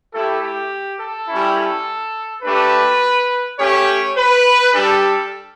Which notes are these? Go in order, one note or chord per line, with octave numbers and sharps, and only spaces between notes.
A3 E4 G4 A4
G4
A4
G3 C#4 E4
A4
A3 D4 G4 B4
A3 C#4 G4 C#5
B4
G3 D4 G4 A4